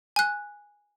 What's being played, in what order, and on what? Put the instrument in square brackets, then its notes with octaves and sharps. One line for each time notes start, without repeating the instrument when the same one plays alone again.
[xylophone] G#5 F#6